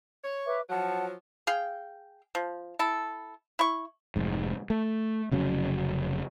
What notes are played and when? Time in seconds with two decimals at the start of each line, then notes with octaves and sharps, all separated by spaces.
0.24 C#5
0.46 B4 E5 D6
0.69 F3 F#3 F#5 A5
1.47 G#4 F5 G5
2.35 F3
2.79 E4 A4
3.59 E4 C#6
4.16 F1 G#2
4.70 A3
5.32 F1 C#3 F#3 C#4